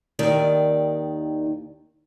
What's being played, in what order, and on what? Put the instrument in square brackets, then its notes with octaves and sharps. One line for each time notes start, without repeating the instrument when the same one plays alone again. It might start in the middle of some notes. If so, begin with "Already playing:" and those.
[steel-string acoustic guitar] D#2 D#3 D5